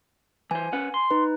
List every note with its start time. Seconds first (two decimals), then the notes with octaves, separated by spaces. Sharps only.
0.51 E3 C5 G#5
0.73 C#4 B4 F#5
0.94 C6
1.11 D#4 B4